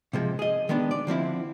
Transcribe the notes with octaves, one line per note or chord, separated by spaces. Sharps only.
C3 F3 G#3
G#4 D#5
D#3 G#3 B3 D4
D5
D3 F3 C4 E4